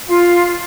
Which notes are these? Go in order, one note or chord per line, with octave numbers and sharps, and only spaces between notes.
F4